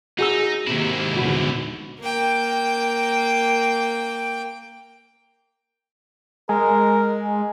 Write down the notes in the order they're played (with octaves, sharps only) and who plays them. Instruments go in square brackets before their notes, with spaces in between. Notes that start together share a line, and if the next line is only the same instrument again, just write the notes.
[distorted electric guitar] D#4 [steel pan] F#4 G#4 E6
[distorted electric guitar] G#2 E4 [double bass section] C3 D#3 A#3
[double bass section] A#1 E2 D3 [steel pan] F#4 B5
[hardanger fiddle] A#3 G5
[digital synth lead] G#3 [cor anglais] A#4